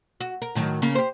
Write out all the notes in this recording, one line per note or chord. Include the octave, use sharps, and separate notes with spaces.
F#4
A#4
A2 D#3 F#3
C#3 A#3 C#4
G4 C5